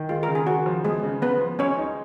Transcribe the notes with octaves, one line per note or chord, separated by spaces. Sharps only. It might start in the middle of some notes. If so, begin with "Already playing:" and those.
Already playing: D#3
G#3 F4
A#4
C#3
G#4
C#3 F#4
F3
G#3 B3 G#4
C#3
C#3 B3 B4
F3
G#3 C#4 C#5
D#4